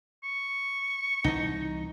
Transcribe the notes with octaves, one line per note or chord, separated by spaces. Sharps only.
C#6
C2 E3 D#4